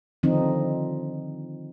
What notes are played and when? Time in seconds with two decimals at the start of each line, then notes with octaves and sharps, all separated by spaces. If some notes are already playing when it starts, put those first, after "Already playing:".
0.23 D3 D#3 F3 C4 D#4